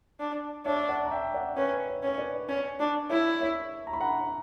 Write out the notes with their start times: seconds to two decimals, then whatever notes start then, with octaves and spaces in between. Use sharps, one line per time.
0.20 D4
0.65 D4 C#5 E5
0.89 D5 F#5
1.05 A#5
1.11 E5 G5
1.34 D5 F#5
1.57 C#4 B4
1.88 C#5
2.03 C#4 C#5
2.18 B4 D5
2.49 C#4 C#5
2.79 D4
3.10 E4 C#5 E5
3.41 C#5 E5
3.87 A#5
3.93 B5
4.00 F#5 A#5